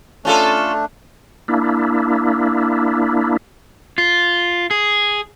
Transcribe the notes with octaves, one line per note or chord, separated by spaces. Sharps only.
A3 C#4 D4 F4 A4
A#3 D4 E4
F4
G#4